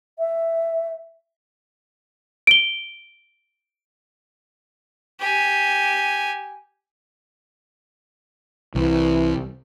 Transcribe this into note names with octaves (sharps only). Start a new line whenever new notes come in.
E5
D7 G7
G4 G#5
C2 E3